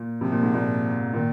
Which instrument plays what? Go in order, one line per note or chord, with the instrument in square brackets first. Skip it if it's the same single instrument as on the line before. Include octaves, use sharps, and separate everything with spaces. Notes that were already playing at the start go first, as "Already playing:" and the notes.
Already playing: [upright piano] A#2
[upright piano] C3 [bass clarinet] F3
[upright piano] A#2
G#2
A#2
[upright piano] A#2 [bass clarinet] D#3